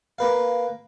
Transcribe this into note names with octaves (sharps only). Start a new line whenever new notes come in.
A#3 B4 F5